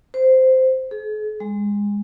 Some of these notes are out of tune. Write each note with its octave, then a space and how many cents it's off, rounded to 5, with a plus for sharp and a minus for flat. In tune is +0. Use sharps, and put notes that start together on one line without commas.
C5 -10
G#4 +45
G#3 -25